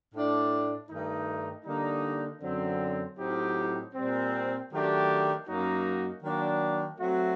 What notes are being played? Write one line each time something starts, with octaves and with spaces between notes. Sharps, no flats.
A2 A3 D4
G2 D#3 A3 D#4
D3 G3 A#3 D#4
F#2 D3 F#3 C4
A2 F#3 C4 D#4 G4
A#2 G3 C4
D#3 F#3 A3 D4 G4
F#2 F#3 A#3 D#4 F#4
D#3 F#3 A#3 D4
F#3 A3 C4 F#4